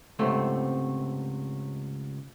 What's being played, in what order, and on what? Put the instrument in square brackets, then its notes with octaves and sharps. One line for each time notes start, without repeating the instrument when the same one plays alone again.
[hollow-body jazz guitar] C#2 G#2 C3 A3 C4